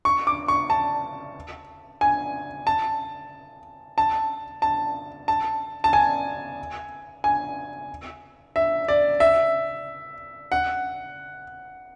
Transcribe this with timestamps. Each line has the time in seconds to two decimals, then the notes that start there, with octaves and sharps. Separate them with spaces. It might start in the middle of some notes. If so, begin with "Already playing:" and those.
0.05 C#6
0.27 D6
0.48 C#6
0.70 A5
2.01 G#5
2.67 A5
3.98 A5
4.62 A5
5.28 A5
5.84 A5
5.93 G#5
7.24 G#5
8.56 E5
8.88 D5
9.20 E5
10.52 F#5